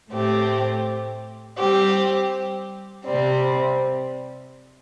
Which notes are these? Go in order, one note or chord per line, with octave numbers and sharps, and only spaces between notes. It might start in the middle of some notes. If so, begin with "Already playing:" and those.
A2 A3 C4 G4
G3 C4 G4
C3 G3 C4